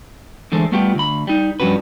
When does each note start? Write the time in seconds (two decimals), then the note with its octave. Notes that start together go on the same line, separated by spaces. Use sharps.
0.52 D3 E3 G#3 A3 A4 C5
0.72 G3 A3 B3 F4 G4
0.95 D2 B5
1.27 G3 D#4
1.60 G2 F3 G3 C#4 F#4 B4